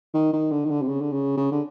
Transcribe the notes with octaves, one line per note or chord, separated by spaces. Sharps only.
D#3
D#3
D3
D#3
D3
C3
C#3
D3
C#3
C#3
D3